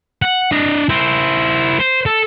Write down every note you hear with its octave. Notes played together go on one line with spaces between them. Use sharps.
F#5
D4 D#5
E4 C5
C5
A4